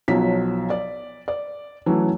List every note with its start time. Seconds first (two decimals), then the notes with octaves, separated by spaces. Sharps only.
0.08 B1 F3 F#3 B6
0.70 D5
1.28 D5
1.86 E3 F#3 A3 C#4